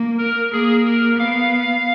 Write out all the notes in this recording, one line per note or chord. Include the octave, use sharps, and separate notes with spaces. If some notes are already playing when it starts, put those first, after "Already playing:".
Already playing: A#3
A#4
A#3 G#4
A#4
B3 F5